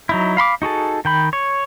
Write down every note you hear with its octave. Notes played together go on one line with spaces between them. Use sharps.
F#3 D#4 E4
F5 B5 C6 D6
D#4 F#4 G#4 A4
D#3 G5 B5
C#5